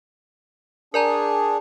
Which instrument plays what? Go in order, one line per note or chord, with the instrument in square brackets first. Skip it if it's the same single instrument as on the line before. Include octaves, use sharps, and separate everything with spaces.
[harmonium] D4 G#4 [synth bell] A#4 D5 A#5